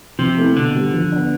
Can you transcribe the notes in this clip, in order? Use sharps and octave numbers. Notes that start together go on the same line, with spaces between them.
C3 F3
A3 C4 E4
B2 D3
G3 B3
F3
B3 D4